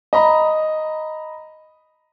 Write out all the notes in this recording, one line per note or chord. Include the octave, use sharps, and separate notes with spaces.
D#5 A#5 B5